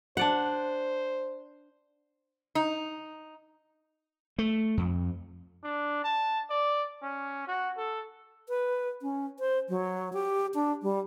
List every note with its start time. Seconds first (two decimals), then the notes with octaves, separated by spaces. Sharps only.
0.17 D4 C5 D5 F#5
2.55 D#4
4.38 A3
4.77 F2
5.64 D4
6.04 A5
6.50 D5
7.02 C#4
7.47 F#4
7.77 A4
8.49 B4
9.02 C#4
9.40 C5
9.69 F#3
10.13 G4
10.54 D4
10.82 G3